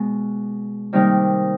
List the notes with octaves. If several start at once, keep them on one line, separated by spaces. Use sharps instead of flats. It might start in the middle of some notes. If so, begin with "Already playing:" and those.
Already playing: B2 G#3 B3
C3 D#3 G3 A#3 D#4